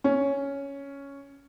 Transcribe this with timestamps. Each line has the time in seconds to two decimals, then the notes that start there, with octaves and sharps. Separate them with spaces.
0.04 C#4